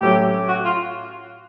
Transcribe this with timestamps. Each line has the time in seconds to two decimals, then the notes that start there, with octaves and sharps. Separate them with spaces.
0.01 A2 F#3 A3 C#4 G4
0.48 F#4
0.65 F4